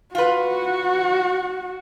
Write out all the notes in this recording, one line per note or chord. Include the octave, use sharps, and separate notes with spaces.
F4 F#4 B4